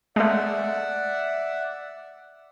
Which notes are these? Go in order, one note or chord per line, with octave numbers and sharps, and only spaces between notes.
G#3 A3 D5 E5 F#5